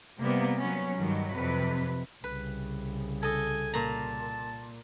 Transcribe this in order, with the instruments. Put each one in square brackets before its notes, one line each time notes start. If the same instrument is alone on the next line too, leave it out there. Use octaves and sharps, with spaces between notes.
[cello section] C3 G3 A#3 B3
F#3 B3 C#4
G2 D#3 F#3
F2 C3 B4
[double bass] C2 C#3 [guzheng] B4
[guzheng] A4 D#5 [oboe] G#5
[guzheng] A#2 A#5 [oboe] A5